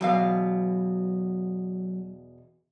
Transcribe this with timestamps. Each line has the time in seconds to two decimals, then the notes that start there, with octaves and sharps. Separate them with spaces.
0.01 E2 B2 F#3 F5